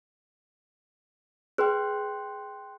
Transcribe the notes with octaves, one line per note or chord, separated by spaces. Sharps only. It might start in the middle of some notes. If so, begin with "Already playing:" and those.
G#4 B4 G5 C6 F#6